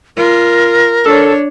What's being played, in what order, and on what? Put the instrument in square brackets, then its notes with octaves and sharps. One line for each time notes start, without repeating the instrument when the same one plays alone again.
[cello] F4 [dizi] A#4
[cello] D4 C#5 [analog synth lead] A4